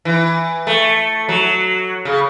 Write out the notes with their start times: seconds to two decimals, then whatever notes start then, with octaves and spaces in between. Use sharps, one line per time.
0.05 E3
0.67 A3
1.29 F#3
2.05 C#3